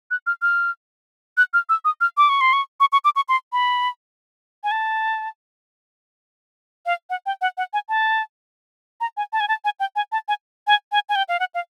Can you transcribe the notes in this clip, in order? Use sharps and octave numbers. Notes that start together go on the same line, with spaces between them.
F#6
F6
F6
F#6
F6
E6
D#6
F6
D6
C#6
C6
C#6
C#6
C#6
D6
C#6
C6
B5
G#5
A5
F5
F#5
G5
F#5
F#5
G#5
A5
A#5
G#5
A5
G#5
A5
G#5
G5
G#5
A5
G#5
G#5
G#5
G#5
G5
F5
F#5
F5